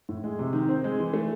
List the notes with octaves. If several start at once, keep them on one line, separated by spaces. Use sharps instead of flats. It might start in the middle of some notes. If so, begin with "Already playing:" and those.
A2
G#3
C3
D#3
C4
G#3
E3
A3